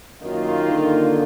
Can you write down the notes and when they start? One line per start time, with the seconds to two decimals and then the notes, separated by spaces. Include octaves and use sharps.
0.23 F#2 D#3 A#3 F4
0.70 D3